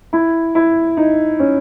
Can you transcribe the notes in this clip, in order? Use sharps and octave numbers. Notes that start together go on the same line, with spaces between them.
E4
E4
D#4
C#4